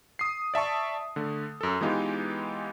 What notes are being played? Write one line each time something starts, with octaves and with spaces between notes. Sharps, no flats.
D#6 C7
D5 E5 A5 C#6
D3 A3
F#2 A4
E3 G#3 B3 D#4 F4 G4